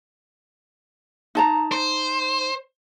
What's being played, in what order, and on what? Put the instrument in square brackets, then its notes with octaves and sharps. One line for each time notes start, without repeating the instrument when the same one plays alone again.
[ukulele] D#4 A5 A#5
[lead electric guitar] C5